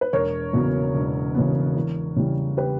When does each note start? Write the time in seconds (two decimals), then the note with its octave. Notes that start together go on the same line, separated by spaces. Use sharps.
0.01 B4
0.13 E1 A#4 C#5
0.53 E2 C#3 F#3 B3
0.94 E1
1.35 E2 C#3 F#3 B3
1.76 E2
2.16 C#3 E3 G3
2.57 G4 B4